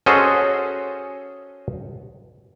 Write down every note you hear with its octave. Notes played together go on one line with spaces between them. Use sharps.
C#4 F#4 G#4 A4 C5 D#5